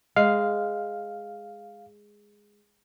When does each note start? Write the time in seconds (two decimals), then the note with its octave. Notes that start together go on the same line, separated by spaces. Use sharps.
0.16 G#3 F5